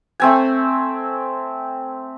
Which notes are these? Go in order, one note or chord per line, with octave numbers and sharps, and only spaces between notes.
A3 C4 G#5